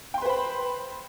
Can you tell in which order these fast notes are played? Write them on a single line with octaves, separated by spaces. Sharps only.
G5 C6 B4 C5 B5